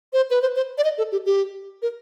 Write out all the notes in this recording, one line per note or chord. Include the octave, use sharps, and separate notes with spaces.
C5
B4
C5
C5
D5
D#5
A4
G4
G4
A#4